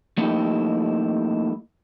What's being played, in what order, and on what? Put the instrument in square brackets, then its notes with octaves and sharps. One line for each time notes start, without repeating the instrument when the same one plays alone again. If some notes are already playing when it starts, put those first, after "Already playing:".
[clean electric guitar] F3 A3 A#3 D#4 E4 G4